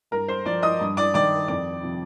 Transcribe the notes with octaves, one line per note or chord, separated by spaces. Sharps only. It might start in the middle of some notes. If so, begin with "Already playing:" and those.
G2 A#4 A#5
C5 C6
F3 D5 D6
D#5 D#6
G2
D5 D6
D#3 D5 D6
F2 D5 D6
C3 F3